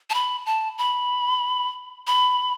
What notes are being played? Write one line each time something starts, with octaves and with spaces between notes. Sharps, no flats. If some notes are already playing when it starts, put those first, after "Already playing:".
A5
B5
A5
B5
B5